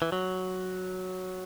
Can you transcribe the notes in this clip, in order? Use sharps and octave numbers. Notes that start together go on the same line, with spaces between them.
E3
F#3